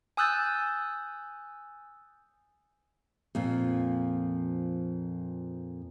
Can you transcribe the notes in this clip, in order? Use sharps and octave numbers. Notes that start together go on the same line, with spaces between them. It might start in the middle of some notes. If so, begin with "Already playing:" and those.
G#5 D#6 E6 F#6 G6 A6
F2 A#2 F3